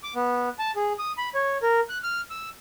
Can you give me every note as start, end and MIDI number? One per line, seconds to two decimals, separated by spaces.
0.03 0.14 86
0.15 0.49 59
0.59 0.71 81
0.76 0.93 68
0.99 1.12 87
1.18 1.29 83
1.35 1.58 73
1.62 1.80 70
1.89 1.98 90
2.03 2.21 89
2.30 2.49 88